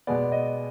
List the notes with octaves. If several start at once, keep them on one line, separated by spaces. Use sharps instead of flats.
B2 G#3 B3 D5
D#5